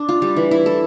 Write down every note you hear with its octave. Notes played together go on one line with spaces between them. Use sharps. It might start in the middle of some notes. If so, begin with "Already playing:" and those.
Already playing: D4
F4
G3
E3
E4
A4